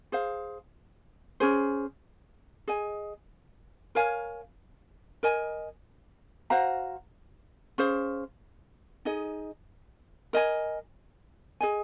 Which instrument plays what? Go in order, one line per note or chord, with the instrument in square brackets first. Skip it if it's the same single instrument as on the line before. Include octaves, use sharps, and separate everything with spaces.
[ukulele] G#4 C5 F5
C#4 G#4 C5
G#4 D#5 G#5
A#4 C#5 F5 G#5
A#4 D#5 G#5
F#4 C5 F5 A#5
C#4 G#4 C5 F5
D#4 G#4 D#5
A#4 D#5 G#5
G#4 D#5 G#5